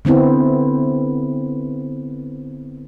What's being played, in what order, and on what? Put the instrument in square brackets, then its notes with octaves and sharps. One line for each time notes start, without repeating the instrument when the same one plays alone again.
[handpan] D3 B3 C4 E4